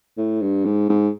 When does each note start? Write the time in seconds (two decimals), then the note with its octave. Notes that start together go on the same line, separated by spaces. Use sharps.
0.17 A2
0.41 G2
0.65 G#2
0.89 G#2